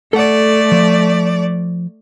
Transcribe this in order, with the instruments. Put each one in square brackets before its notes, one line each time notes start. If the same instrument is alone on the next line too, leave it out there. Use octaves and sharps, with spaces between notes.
[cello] A3 D5 [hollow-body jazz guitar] A4 F#5
[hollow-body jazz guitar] F3